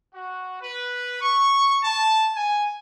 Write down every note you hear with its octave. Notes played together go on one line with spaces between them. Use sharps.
F#4
B4
C#6
A5
G#5